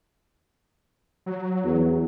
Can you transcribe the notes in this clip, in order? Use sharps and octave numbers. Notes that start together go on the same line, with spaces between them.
F#3
E2